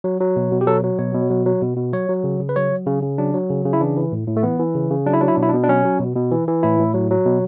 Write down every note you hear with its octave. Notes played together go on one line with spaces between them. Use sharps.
F#3
F#3
B2
B2
G4
F#3 A4
F#3
B2 C#5
B2
F#3
F#3
B2
B2
F#3 C#5
F#3
C#3
C#3
B4
F#3 C#5
F#3
C#3
C#3
F#3 D4
F#3
C#3
C#3
E4
E3 D4
E3
A2
A2
A3
E3 B3
E3
C#3
C#3
F#3 D4
E4
F#3 D4
E4
B2 D4
E4
D4
B2
D4
F#3 C#4
F#3
B2
B2
E3
E3
A2 E4
A2
F#3
F#3
B2